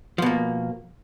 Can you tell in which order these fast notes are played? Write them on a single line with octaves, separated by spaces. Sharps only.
F3 B2 A#3